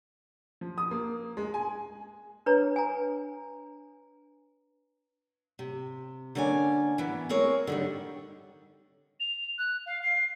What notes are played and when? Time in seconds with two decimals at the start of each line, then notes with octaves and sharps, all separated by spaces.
0.61 F3
0.78 D#6
0.91 A#3
1.37 G#3
1.54 G#5
2.46 D4 B4 C#5 A#5
2.76 G#5 A#5
5.59 C3
6.35 D3 A#3 C#4 D5 G#5
6.98 E3 B3
7.29 G#3 C4 A#4 C#5
7.67 D3 D#3 G3
9.20 F7
9.58 F#6
9.86 F5
10.03 C7